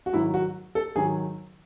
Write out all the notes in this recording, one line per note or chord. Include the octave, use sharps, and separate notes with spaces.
F#4
G#2 D#3 F#3 E4
F#4
A4
G#2 D#3 F#3 G#4